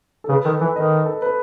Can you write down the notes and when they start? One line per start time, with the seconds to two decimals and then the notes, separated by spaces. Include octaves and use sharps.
0.24 A4
0.29 C#3 B4
0.45 D#3 A4
0.60 E3 B4
0.76 D#3 D#5
1.06 A4
1.22 B4